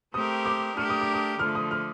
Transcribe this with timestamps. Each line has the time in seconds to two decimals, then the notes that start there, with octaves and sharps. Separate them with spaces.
0.14 A3 C4 G4 A#4 D#6
0.46 D6
0.77 A3 D4 G4 A#4 F6
0.89 D#6
1.01 D6
1.14 D#6
1.39 D3 F6
1.42 F3 A3
1.55 D#6
1.71 F6